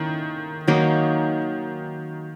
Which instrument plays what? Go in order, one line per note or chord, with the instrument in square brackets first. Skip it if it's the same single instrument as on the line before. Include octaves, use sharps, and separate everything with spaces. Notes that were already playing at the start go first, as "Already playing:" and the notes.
Already playing: [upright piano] D#3 [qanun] A#3 C#4 E4
[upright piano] D#3 [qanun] F#3 A#3 D#4